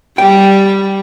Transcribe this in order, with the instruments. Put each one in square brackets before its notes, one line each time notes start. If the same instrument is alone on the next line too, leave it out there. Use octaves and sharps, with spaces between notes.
[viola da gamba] G3 [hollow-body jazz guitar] G5